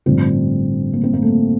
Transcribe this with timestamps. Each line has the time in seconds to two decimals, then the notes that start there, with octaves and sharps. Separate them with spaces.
0.06 A1 G2 D3 F3 C4
0.93 A#3
1.04 C4
1.13 A#3
1.22 A3